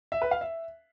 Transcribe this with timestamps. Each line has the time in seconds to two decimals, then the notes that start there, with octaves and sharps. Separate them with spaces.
0.12 E5
0.22 B4
0.31 F5
0.41 E5